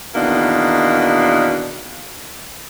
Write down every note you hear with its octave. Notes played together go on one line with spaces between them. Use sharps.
E2 B2 D#3 A#3 D4